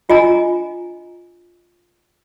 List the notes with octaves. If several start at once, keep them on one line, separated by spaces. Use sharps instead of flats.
D4 F4 D#5 G#5 A#5